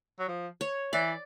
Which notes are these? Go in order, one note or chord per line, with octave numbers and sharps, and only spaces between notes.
F#3
F3
C#5
E3 D5